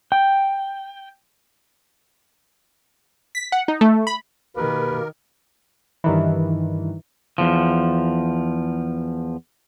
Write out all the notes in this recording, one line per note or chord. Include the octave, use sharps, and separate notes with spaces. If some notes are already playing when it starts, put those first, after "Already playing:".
G5
B6
F#5
D#4
A3
B5
B2 D#3 A#3 G4 A#4 B4
G2 D#3 E3
E2 F3